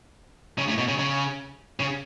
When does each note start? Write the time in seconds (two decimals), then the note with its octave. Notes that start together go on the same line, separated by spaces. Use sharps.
0.58 C#3
0.68 A2
0.78 B2
0.88 C#3
0.99 C#3
1.80 C#3